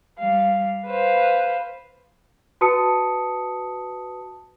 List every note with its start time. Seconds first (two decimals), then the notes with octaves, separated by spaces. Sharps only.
0.19 G3 F5
0.86 B4 C5 F5
2.61 F#4 B4 A5 D#6 C#7